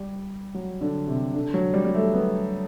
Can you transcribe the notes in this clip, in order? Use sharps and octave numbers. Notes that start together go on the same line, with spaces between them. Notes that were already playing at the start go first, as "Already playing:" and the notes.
Already playing: G3
F#3
D3
C3
D3
F#3
G3
G3
A3
B3